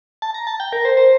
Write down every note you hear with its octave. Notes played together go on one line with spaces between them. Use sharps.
A5
A#5
A5
G5
A#4
C5
C5